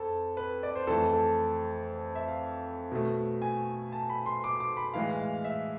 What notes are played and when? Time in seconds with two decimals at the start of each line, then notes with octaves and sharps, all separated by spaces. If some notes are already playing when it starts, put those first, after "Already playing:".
Already playing: F2 A4
0.37 B4
0.63 D5
0.75 C5
0.87 F2 E3 A3 A4
1.13 A4
2.15 E5
2.28 F5
2.92 B2 A3
3.42 G#5
3.93 A5
4.10 B5
4.26 C6
4.44 D6
4.60 D6
4.77 B5
4.94 A2 E3 G#3 F5
5.20 F5
5.44 E5